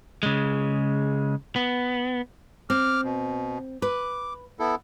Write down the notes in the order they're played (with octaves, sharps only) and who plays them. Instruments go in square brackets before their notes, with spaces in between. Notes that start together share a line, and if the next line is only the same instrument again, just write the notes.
[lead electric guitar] C#3 G#3
B3
[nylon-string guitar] C4 [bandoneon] D6 F6
[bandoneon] B2
[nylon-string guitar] B4 [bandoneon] D6
[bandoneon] B3 E4 A4